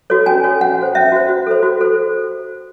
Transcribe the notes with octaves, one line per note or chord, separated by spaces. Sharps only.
F#4 A4 C#5
C#4 G#5
F#4 A4 C#5
C#4 F#5
F#4 C5
C#4 E5
F#4 C5
F#4
A4 C5
F#4
A4 C5